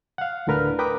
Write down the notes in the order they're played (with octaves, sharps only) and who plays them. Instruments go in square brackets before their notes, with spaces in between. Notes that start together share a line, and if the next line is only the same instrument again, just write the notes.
[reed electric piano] F5 F#5
D2 A2 D3 A#4 B4 F6
A#4 B4 G5 A#5 D6 D#6